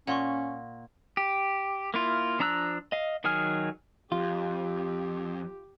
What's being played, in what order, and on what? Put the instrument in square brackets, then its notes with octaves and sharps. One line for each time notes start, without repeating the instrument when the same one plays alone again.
[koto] A#2 [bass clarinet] C#4 [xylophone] F#5 C6 C#6
[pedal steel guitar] G4
A#3 E4 F4
F3 D4 A#5 E6 F#6
D#5 F5
D#3 F#3 G#4 G#5 F6
[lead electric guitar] F2 [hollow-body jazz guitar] F4 [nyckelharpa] G4